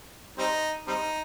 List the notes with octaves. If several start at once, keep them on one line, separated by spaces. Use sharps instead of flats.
G3 C4 D#4
G3 C4 D#4